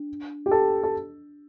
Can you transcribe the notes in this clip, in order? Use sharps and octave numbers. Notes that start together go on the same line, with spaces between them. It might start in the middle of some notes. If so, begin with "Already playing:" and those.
Already playing: D4
G4
A4
A4